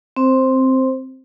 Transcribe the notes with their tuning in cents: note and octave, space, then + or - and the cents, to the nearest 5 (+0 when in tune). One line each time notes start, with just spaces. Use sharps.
C4 +0 C5 +5